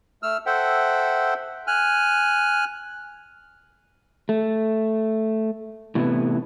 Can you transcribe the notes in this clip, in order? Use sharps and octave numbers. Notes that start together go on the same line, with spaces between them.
A3 E6 F6
A4 C5 E5 F#5 G5
G#5 F6 F#6
A3
A2 C3 E3 A#3 B3 E4